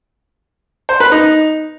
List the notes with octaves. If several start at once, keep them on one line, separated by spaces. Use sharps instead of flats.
C5
B4
D#4